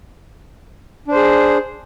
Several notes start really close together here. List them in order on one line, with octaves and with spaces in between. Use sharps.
D4 C5 G#4